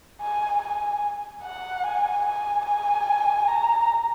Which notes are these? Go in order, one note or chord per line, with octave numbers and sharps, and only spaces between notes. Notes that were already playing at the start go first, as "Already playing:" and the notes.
G#5
G#5
F#5
G#5
G#5
G#5
A#5